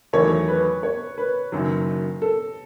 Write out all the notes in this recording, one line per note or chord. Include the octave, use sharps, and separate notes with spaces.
E2 D#3 F#3 A3 C#5
B4
C#5
B4
F#1 F#2 D#3 F#3
A4